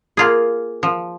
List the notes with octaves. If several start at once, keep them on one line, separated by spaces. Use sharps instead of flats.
A#3 F4 G#4
F3